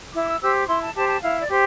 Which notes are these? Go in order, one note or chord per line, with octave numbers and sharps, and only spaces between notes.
E4 D6
E6
G4 C5 E6
D6
E4 C6
A5
G4 C5 A5
A5
E4 F5
D5
G4 C5